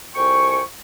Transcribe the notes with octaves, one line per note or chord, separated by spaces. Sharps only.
C2 F2 C5 G5 G#5 C#6